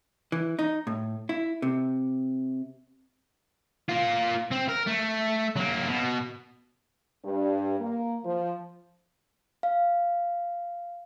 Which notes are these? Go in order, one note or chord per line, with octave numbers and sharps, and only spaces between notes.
E3
D#4
A2
E4
C3
A#3 F4
C4
A#4
A3
F#3 A#3
B2
G2
A#3
F3
F5